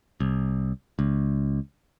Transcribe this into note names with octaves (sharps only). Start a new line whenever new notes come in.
C2
C#2